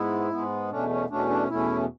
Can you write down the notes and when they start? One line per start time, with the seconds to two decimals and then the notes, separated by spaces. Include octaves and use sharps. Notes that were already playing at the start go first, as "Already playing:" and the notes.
Already playing: G#2 G#3 B3 E4
0.31 G#2 G#3 B3
0.70 E2 B2 A3 C#4 D4
0.90 C#4
1.09 E2 B2 A3 C#4 D4
1.30 D4
1.49 E2 B2 A3 C#4 E4